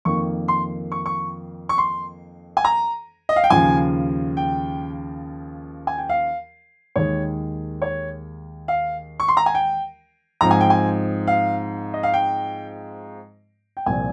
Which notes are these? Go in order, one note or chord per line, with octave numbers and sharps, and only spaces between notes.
F2 D#3 A#3 C#6
C6
C#6
C#6
C#6
C6
G#5
A#5
D#5
F5
G5
D#2 C#3 F3 G#5
G5
G#5
G5
F5
D#2 D#3 G#3 C#5
C#5
F5
C#6
C6
A#5
G#5
G5
G#2 F3 C4 A#5
G#5
G5
G#5
F5
D#5
F5
G5
G5
C2 A#2 F3 C4 G#5